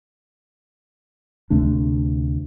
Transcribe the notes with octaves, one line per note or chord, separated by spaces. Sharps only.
D2 C3 A3 D4